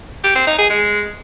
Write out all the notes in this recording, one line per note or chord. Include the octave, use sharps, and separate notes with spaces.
G4
C4
D#4
G#4
G#3